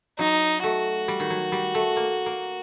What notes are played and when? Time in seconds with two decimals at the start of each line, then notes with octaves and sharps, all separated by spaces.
0.19 F#3 D#4
0.64 A3 F#4
1.08 G3
1.20 D#3
1.30 F#3
1.52 G3
1.75 A3
1.97 A#3
2.26 A#3